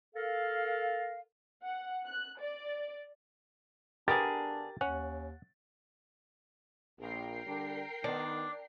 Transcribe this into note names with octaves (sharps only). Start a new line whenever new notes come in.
A4 A#4 F5
F#5
F#6
D5
D3 B3 D4 G4 G#4 A#4 A6
D#2 C#4 F#5
A#1 A#2 A#4 G5 C7
D3 G3 D4
D#3 B3 D4